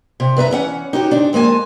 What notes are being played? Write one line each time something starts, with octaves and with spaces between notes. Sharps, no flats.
C3
G2 B4 E5 A#5
E3 C#4 F#5
D#4 F#4 G4 C#5
G#2 D#3 D4
F2 G#3 A#3 G#5 A5